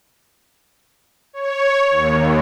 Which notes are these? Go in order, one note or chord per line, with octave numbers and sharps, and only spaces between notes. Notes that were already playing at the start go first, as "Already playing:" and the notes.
C#5
D#2